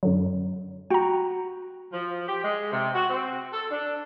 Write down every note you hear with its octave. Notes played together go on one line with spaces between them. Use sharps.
F#2 D3 F#3
F#4 G5 A#5
F3
G4
G#3
C3
F#4
C4
A4
D4